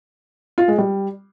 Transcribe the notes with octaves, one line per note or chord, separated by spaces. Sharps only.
F4
G#3
G3